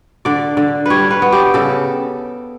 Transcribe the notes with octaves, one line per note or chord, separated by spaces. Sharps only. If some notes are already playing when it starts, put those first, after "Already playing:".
D3 D5
D3
G3 B4 C#5
B4
B3
G4
C#3 A4